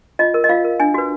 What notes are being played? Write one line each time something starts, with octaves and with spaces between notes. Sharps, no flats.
F4 D#5
A#4
D#5
F4 F5
A#4
D4 G#5
F#4 B4